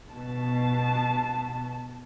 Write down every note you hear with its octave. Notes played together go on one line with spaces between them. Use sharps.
B2 A5